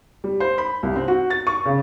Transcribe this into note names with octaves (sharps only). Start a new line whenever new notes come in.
G3
C5
B5
C2
C4
F#4
A6
C#6
C#3